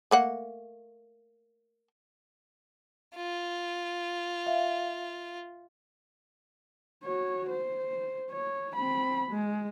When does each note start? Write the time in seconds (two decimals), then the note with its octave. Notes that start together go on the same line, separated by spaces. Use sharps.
0.11 A3 A#3 F#5
3.16 F4
4.47 E5 F5
7.04 F#4 C#5
7.50 C5
8.31 C#5
8.75 C4 B5
9.31 G#3